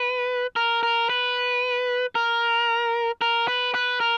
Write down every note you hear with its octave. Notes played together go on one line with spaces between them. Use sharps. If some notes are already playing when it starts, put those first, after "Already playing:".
Already playing: B4
A#4
A#4
B4
A#4
A#4
B4
B4
A#4